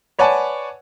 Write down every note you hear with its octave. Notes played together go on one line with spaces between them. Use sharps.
B4 C#5 D5 F#5 G#5 A5